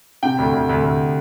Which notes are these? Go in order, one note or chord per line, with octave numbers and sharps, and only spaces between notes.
C3 G5
D2
D2
D2
D2